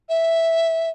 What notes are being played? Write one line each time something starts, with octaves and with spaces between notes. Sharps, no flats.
E5